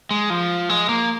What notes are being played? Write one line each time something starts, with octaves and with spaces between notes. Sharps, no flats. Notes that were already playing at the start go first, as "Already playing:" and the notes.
G#3
F3
G#3
A#3